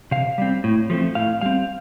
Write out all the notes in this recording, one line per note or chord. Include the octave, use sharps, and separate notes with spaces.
C3 F5
G3 C4
A2
F3 A3 C4
A2 F5
G3 C4 F5